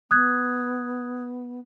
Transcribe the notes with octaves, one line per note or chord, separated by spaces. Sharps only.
B3 D#6 F#6 G#6